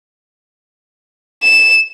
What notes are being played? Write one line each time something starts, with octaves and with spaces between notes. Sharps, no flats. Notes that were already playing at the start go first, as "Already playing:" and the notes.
E7